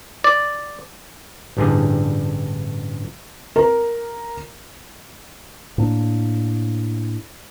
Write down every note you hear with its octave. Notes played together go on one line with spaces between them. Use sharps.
D5
A1 G2 D3 G3 G#4
A#4
A2 A#3 D4